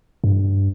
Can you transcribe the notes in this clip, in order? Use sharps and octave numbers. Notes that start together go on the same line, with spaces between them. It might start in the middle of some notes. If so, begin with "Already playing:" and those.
G2